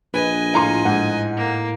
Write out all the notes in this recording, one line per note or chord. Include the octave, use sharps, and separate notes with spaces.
A#1 B4 D#5 G#5
A2 F4 A4 F5 A#5 C6
G#2 F#5
A#3